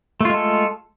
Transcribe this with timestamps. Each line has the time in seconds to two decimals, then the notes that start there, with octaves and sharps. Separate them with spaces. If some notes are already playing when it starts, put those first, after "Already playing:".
0.21 A3
0.25 F4
0.30 G#3
0.34 A4